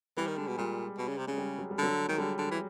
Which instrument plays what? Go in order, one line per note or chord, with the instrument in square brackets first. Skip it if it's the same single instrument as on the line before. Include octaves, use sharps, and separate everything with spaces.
[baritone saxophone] E3 [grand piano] G3
[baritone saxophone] D#3
[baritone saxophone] D3 [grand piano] G#3
[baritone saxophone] B2
[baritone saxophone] A#2 [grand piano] G3
[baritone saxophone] B2
C#3
C3
[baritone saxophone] C#3 [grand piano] G#3
[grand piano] G3
F#3
G3
[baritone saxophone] D3 [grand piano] F#3
[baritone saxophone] D#3 [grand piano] G#3
[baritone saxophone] D3 [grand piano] G3
[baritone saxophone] D3
E3